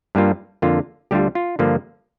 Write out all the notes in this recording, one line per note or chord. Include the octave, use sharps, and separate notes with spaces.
G2 G3 A#3 F4
F2 D3 A#3 F4
D2 D3 G3 D4 F4 G4
F4
G2 D3 F3 A#3 F4